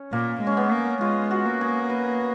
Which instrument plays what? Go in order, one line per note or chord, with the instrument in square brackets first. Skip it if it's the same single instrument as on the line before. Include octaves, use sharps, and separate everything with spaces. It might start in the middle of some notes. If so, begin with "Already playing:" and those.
Already playing: [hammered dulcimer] C#4
[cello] A#2 [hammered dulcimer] A#3
[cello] G#3
[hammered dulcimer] C#4
B3
[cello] A#3
[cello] G#3 [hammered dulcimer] F4
[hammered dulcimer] F#4
[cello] A#3
[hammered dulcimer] G#4
B4